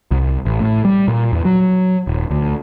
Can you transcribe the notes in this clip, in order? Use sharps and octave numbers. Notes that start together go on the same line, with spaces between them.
C2
A1
A2
G3
A#2
E2
F#3
D#1
D2